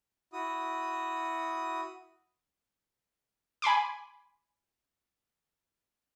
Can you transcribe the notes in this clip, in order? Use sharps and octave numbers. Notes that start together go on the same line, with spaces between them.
E4 F#4 D#6
G#5 B5 C6 D6